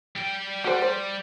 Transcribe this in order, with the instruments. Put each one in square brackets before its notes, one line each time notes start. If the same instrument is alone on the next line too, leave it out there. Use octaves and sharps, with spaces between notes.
[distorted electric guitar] G3 G5
[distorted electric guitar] G3 [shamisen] F#4 C5
[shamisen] C5